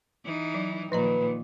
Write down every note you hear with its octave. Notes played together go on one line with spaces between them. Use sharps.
E3 D#4
F#3
A#2 D#3 F3 B4 D#5 A#5